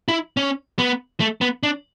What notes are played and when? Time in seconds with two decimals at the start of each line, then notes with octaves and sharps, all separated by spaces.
0.08 E4
0.37 C#4
0.79 B3
1.20 A3
1.41 B3
1.63 D4